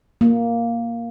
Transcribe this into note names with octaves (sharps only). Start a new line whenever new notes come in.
A#3